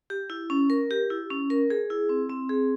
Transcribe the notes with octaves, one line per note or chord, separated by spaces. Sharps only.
G4
E4
C#4
A#4
G4
E4
C#4
A#4
G#4
E4
C4
C4
G#4